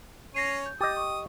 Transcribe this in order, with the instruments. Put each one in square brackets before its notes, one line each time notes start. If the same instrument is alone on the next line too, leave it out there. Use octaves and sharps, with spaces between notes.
[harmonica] C#4 C#5 [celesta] A#6 C7 D#7
[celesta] G6
[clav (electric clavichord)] G4 D#5 [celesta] D6 A6 [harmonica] D#6
[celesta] C#6